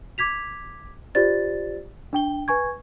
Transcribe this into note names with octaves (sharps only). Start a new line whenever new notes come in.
D6 G#6 B6 F7
F4 G4 C5 D5 A6
D4 G5 G7
B4 G#5 C#6 G#6